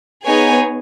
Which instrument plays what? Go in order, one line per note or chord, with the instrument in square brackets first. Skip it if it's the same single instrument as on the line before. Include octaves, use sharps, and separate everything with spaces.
[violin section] B3 D#4 G#4 C#5 G#5